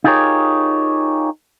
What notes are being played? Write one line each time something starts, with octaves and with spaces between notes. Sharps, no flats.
D#4 F4 G4 G#4 A#4 C#5